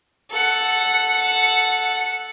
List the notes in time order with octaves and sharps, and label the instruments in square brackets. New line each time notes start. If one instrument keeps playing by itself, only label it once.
[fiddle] A4 F#5